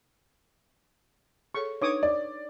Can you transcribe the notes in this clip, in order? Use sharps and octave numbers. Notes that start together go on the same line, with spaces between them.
G#4 A4 C#5 C#6
D4 D#4 B4 C#5 D6 D#6
D5